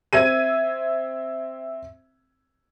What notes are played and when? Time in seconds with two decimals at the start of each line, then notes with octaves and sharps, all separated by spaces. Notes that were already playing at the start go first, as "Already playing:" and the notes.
0.13 C4 E5 G#6 D#7